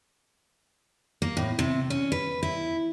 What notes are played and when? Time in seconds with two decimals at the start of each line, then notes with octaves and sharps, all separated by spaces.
1.22 A#3
1.37 A2
1.59 C3
1.90 C#4
2.12 B4
2.43 E4